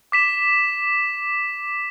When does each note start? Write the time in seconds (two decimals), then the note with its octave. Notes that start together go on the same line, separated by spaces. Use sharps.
0.12 D6 B6 E7